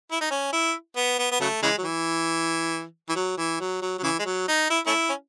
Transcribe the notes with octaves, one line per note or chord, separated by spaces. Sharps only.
E4
D#4
C#4
E4
B3
B3
B3
C#3 F#3 A3
C#3 E3 G#3
F#3
E3
E3
F#3
E3
F#3
F#3
F#3
C#3 E3
G#3
F#3
D#4
E4
A3 C#4 E4
C#4